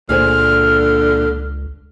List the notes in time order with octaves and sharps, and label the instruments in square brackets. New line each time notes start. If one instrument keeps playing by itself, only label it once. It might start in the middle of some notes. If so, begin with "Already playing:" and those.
[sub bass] C#2 [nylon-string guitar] A#2 G#4 C5 [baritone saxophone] D3 [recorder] F6